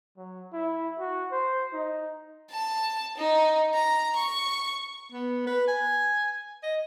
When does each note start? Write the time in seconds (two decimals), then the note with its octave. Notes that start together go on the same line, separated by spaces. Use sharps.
0.17 F#3
0.53 E4
0.99 F#4
1.32 C5
1.73 D#4
2.51 A5
3.18 D#4
3.74 A#5
4.16 C#6
5.12 B3
5.47 B4
5.68 G#5
6.63 D#5